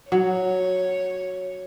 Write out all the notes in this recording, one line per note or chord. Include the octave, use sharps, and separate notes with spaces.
F#3 C#5